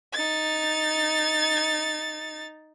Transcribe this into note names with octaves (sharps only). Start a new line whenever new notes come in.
D#4 A6